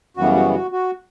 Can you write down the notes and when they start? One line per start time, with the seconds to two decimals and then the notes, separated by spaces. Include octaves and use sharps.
0.17 F#2 C#3 E3 G3 B3 F#4
0.35 F#4
0.54 F#4
0.72 F#4